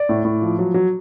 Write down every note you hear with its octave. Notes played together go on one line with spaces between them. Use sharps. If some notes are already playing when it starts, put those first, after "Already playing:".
Already playing: D5
A2
A2
F3
F#3
F#3